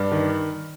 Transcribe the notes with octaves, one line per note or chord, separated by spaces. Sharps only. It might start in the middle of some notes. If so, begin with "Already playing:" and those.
Already playing: G2 D4
D#3